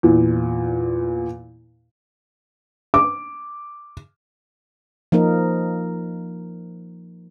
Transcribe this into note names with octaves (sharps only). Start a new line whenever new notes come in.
E2 A#2
D6
F3 A#3 D#4 A#4